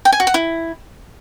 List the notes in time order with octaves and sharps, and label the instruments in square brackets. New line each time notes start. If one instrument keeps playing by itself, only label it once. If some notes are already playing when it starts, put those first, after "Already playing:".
[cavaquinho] G5
G#5
F#4
F#5
E4